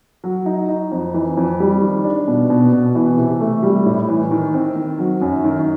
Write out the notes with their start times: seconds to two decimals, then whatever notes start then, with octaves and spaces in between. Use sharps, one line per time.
0.24 F#3
0.46 D#4
0.69 D#4
0.92 F2
1.14 E3
1.37 F2
1.60 G3
1.82 D#3
2.04 D4
2.28 B2
2.50 B2
2.73 B2
2.95 E3
3.18 C3
3.40 A3
3.63 G3
3.86 A2
4.09 E3
4.31 D#3
4.54 C4
4.76 D#3
4.99 F#3
5.22 F#2
5.44 D#3